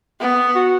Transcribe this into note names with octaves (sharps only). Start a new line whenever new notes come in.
B3
F#4